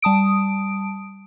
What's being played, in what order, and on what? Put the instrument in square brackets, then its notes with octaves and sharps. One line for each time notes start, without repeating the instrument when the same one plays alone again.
[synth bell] G3 A5 D#6 D7